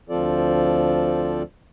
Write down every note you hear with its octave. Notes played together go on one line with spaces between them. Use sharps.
D2 F3 C4 F4 A4 D5